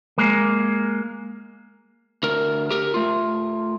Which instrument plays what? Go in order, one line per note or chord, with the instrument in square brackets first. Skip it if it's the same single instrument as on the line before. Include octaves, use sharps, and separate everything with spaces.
[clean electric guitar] G#3 A#3
[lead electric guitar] D2 A#4
G4 A#4
A3 F4